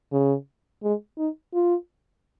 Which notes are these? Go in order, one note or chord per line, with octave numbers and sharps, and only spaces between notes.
C#3
G#3
D#4
F4